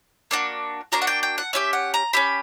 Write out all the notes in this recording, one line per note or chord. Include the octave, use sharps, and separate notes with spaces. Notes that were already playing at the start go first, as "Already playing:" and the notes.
A#3 D4 F#4
A#3 D4 F#4 A#5
F#5
G5
G5
F#5
C#4 E4 G4 E5
F#5
A#5
C#4 E4 G4 B5